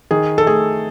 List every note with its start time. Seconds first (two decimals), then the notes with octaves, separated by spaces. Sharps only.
0.11 D#3 G#4
0.38 A4
0.47 A3 G#4